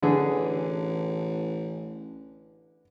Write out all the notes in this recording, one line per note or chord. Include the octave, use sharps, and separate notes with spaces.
A1 D3 E3 G#4